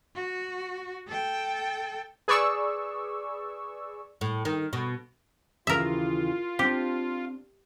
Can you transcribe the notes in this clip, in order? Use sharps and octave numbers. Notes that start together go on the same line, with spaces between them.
F#4
A4 G5
G#4 B4 D5 C#6 E6
A2
D#3
B2
D#2 C#3 E3 F4 A#4 E5
C4 D4 G4